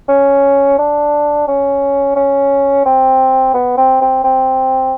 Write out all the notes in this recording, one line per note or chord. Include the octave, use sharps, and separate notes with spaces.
C#4
D4
C#4
C#4
C4
B3
C4
C4
C4